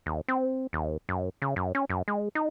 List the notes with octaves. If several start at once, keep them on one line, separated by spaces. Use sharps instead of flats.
D#2
C4
D#2
F#2
C#3
F#2
C#4
F#2
G#3
D#4